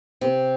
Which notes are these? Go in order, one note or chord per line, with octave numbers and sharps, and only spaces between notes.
C3